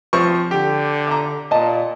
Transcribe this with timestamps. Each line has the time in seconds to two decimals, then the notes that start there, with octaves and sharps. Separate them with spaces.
0.13 F3 C4 C#6
0.51 D3 G4
1.07 A#5 D6
1.51 A#2 D#5 A5